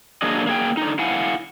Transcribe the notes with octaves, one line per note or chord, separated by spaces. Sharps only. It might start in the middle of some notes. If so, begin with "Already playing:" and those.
F#3 A#3 D4 G#4 D#5
A#3 G#4 G5
D3 D#4
E4 F5 F#5 G#5